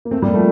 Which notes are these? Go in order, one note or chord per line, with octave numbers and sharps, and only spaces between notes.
A#3
A3 C4
G3 A#3
F3 A3